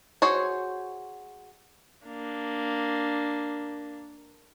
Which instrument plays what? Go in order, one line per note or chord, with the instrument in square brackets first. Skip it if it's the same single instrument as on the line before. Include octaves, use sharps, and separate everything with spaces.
[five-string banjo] F#4 G#4 C5 C#5
[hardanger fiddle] A#3 D4